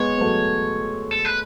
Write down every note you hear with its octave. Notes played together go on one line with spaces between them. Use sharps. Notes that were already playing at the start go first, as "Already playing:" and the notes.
Already playing: G#3 B3 C#5
B3
F#3 A3
A4
B4